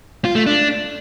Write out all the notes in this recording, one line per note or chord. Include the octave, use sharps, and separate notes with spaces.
F4
A3
D4